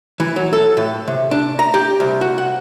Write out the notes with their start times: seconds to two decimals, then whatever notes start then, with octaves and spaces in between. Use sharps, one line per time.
0.20 E3
0.36 F#3
0.53 A4
0.77 A2
1.08 C3
1.31 D4
1.59 A#5
1.74 G4
2.00 C2
2.21 F#4
2.38 F#5